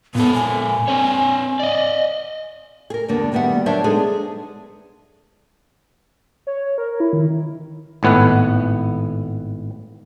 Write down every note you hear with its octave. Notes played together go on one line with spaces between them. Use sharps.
A#2 B3 A4
G#5
C4 C#5
D5 D#5
G#4 A#4
E2 G2 D3 A#3 B3
D2 D#3 G3 B3 E5 F#5
F#3 D4 A#4 C5 C#5 E5
G#3 B3 D4 D#4 G#4 A4
C#5
A#4
E4
D#3
G#1 A2 B3 B4 F#5